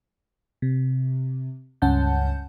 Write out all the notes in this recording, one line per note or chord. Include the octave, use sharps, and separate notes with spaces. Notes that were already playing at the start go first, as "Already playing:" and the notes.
C3
C#2 G2 C#4 F#5 A5 G6